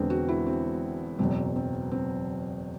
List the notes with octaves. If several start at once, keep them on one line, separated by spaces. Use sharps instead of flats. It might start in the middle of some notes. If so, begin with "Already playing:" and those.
Already playing: E1 E2 D3 B3 C4
F#4
E4
C4
F#1 E2 B2 F#3 C4
C4
C4